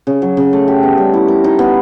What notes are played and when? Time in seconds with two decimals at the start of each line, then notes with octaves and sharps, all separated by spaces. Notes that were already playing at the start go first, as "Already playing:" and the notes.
0.07 C#3
0.22 F#3
0.37 C#3
0.53 A3
0.68 G4
0.83 B3
0.98 G3
1.14 E4
1.28 A#4
1.44 D#4
1.59 B3